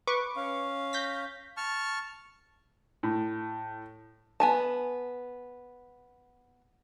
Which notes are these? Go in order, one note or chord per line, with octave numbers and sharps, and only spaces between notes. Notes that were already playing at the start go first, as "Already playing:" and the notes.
B4 C#6 D6
C#4 F5
G6 A#6 B6
A5 C#6 F6
A2
B3 G#5 A5